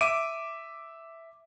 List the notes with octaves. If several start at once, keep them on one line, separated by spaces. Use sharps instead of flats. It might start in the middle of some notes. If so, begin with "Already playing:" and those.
E5 D6 D7 D#7